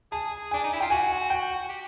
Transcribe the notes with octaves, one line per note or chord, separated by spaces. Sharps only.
G#4 A5
D4 G#5
D#4
E4
F4 G5
F#4 G#5
G5
G4